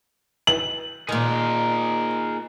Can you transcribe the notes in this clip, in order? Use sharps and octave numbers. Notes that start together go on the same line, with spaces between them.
F#7
A#2 D#3 G#4 A#4